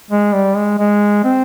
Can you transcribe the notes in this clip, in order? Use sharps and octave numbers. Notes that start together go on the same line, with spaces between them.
G#3
G3
G#3
G#3
C4